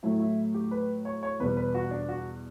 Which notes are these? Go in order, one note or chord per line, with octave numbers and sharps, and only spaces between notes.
A2 F#3 A3 E4
E4
G4
B4
C#5
C#5
E2 B2 G3 B4
B4
F#4
D4
F#4